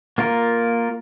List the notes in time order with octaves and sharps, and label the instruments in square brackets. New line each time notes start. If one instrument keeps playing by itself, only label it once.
[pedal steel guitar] A#3 F4 A#4